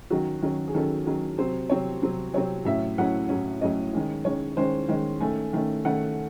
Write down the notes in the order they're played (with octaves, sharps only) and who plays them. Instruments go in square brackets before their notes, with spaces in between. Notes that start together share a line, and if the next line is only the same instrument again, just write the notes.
[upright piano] D#3 F#3 C#4 F#4
D#3 F#3 C#4
G#4
D#3 F#3 C#4 A4
D#3 F#3 C#4
C3 F#3 C4 C5
C3 F#3 C4 C#5
C3 F#3 C4
C3 F#3 C4 C#5
A2 F#3 C#4 E5
A2 F#3 C#4 F#5
A2 F#3 C#4
A2 F#3 C#4 D#5
D#3 G#3 C#4
D#3 G#3 C#4 C#5
D#3 G#3 C#4 C5
D#3 G#3 C#4
D#3 A3 C#4 G#5
D#3 A3 C#4
D#3 A3 C#4 F#5